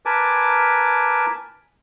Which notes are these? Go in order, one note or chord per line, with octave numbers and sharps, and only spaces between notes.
A#4 B4 G#5 A5 D6